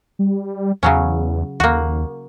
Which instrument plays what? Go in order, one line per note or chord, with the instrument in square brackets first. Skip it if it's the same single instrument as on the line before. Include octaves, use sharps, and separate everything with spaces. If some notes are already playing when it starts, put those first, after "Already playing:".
[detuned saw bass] G3
[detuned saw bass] E2 [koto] C#3 F#3 C#4
[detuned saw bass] D#2 [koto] A#3 F#4